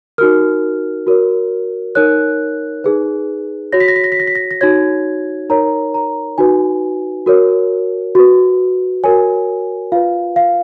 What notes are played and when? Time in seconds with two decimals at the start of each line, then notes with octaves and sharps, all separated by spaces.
0.18 D#4 F#4 A#4 F6
1.07 F#4 A#4 C#5
1.95 D#4 A#4 C#5 F#6
2.84 D#4 G#4 B4
3.72 F#4 C#5 A#6
3.80 B6
3.88 A#6
3.96 B6
4.04 A#6
4.12 B6
4.20 A#6
4.27 B6
4.35 A#6
4.51 A#6
4.61 D#4 F#4 C#5 G#6
5.50 D#4 A#4 C#5 A#5
5.94 A#5
6.38 D#4 F#4 B4 G#5
7.26 F#4 A#4 C#5
8.15 F#4 B4
9.04 F#4 A#4 C#5 G#5
9.92 F4 B4 F5
10.36 F5